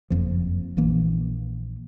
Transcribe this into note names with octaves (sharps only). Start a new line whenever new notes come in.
F#1 F2 F3
A#1 E3 A#3